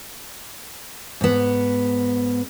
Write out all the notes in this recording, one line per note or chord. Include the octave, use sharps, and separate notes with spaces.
G#2 B3